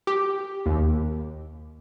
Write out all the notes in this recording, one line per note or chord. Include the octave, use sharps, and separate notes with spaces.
G4
D#2